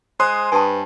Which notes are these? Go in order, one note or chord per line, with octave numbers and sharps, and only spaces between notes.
G#3 C5 C6 D#6
G2 B4 G#5 A5